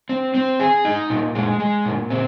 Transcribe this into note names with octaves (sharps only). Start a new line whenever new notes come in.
C4
C4
G#4
D#4
A#2
G#3
G#3
A#2
C4